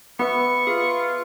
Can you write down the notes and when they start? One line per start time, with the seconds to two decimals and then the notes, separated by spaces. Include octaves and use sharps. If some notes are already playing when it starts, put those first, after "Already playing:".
0.19 B3 B4 E5 C#6
0.67 F4 G#4